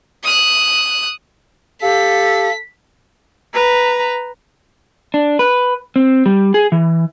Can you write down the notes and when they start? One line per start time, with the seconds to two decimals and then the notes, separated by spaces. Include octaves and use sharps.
0.23 D#6 F#6
1.82 G4 A4 F5 B6
3.54 B4 A#5
5.14 D4
5.39 B4
5.96 C4
6.26 G3
6.54 G#4
6.72 E3